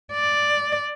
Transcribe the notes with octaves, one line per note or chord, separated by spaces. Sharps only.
D5